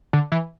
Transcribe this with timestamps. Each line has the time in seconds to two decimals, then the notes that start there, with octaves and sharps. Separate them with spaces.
0.13 D3
0.32 E3